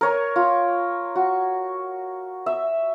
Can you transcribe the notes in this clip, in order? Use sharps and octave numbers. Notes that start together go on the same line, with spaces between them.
A#4 C#5 G#5
F4
F#4
E5